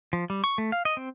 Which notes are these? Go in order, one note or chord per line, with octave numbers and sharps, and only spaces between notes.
F3
G3
C#6
A3
F5
D#5
C4